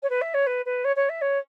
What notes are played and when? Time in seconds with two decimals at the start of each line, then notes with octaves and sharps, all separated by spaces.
0.02 C#5
0.09 B4
0.21 E5
0.34 C#5
0.46 B4
0.65 B4
0.84 C#5
0.96 C#5
1.09 E5
1.21 C#5